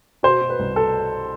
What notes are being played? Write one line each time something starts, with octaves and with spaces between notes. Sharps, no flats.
B2 C5
B2
B4
C2
A4